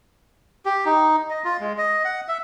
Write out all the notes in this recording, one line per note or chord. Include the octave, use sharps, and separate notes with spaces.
G4
D#4
D#5
F4
G#3
D#5
F#5
E5